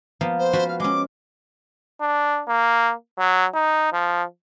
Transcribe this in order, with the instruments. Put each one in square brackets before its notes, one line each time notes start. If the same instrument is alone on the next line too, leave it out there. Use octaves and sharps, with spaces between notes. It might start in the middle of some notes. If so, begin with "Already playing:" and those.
[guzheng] F3 A#3 B3
[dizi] C5
[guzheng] F3 F#4 B4
[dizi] F5
[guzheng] G#3 C#4 [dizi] D6
[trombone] D4
A#3
F#3
D#4
F3